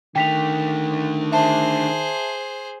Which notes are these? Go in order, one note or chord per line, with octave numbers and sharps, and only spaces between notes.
D3 D#3 A3 G5 B6 F7
G#4 C5 E5 A5